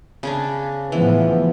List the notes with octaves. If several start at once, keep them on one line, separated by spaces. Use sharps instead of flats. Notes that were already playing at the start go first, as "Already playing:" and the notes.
C#3 C#4 D4
A2 E3 F3 B3